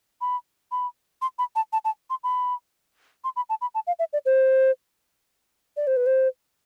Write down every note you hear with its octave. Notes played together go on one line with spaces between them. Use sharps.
B5
B5
C6
B5
A5
A5
A5
C6
B5
C6
B5
A5
B5
A5
F5
E5
D5
C5
D5
C5
B4
C5